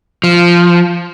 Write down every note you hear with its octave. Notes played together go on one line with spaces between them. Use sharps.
F3